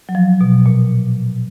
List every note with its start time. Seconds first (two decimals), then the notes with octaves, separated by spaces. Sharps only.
0.09 F#3
0.15 F3
0.41 B2
0.66 A#2